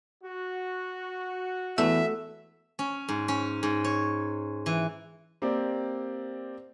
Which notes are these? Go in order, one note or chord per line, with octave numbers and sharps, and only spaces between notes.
F#4
E2 A3 E5
C#4
G#2
C#4
G#2
C#5
E3
A#3 C4 G4 D5